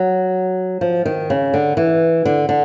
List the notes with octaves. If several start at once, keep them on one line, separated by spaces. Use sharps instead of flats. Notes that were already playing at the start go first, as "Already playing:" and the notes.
Already playing: F#3
F3
D#3
C#3
D3
E3
D3
D3